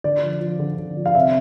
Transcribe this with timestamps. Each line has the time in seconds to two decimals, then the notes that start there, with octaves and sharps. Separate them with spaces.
0.04 D3 D5
0.23 F3
0.41 F3
0.59 D3
0.78 D3
0.97 F3
1.06 F5
1.15 C3 E5